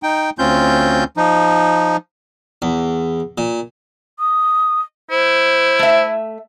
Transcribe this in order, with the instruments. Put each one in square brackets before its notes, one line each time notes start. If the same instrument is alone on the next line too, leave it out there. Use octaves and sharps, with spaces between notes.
[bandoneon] D#4 G5
D2 C4 C#4 F4 G6
F3 D#4
[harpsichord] E2
A#2
[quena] D#6
[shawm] E4 [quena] C5
[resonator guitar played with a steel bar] A3 E5